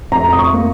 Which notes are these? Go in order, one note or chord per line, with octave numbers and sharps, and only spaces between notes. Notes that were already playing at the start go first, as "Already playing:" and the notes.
F2 A#5
D#6
C#6
A#3